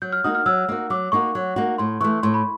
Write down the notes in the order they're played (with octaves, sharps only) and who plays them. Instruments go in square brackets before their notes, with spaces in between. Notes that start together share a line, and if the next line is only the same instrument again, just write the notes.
[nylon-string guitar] F#3 [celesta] G6
[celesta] F6
[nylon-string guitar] A#3 D#4 F#4 [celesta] D#6
[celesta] F6
[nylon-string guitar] F#3 [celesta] E6
[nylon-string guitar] A#3 D#4 F#4
[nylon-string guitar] F#3 [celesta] D6
[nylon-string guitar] A#3 D#4 F#4 [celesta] C#6
[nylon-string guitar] F#3
A#3 D#4 F#4
[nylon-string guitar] A2 [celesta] C6
[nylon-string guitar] E3 A3 [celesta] C#6
[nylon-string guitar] A2 [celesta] C6
[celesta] B5